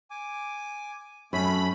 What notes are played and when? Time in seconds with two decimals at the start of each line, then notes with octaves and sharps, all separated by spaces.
0.11 G#5 D6
1.33 F#2 A3 C#4 B5